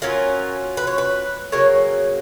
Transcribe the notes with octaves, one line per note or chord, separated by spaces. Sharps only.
F#3 C#4 F4 A#4
B4
C#5
B4
C#3 F#3 A#3 C#5